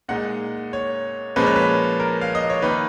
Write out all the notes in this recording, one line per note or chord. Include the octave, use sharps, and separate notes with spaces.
A#2 G#3 D#4 F#5
C#5
A#2 F3 G#3 C#4 B4
C#5
B4
A#4
F5
D#5
C#5
D#3 A#3 D#4 B4